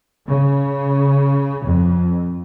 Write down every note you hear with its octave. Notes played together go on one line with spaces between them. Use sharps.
C#3
F2